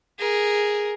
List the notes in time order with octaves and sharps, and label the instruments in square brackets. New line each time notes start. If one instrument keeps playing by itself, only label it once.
[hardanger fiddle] G#4 A#4